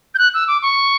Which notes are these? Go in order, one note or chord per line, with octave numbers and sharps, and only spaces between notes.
G6
F#6
E6
D6
C#6